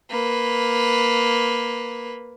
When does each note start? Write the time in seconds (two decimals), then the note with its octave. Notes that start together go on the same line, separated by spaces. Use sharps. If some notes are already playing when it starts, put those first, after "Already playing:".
0.11 A#3 B4